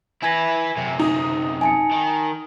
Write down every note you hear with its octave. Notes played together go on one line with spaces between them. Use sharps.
E4 B4 G#5 G#6 A#6
F#2 C3
D#4
G#5 A5 C#7
D#3